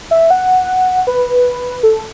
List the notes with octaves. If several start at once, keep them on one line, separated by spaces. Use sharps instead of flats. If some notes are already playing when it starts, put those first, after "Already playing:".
E5
F#5
B4
A4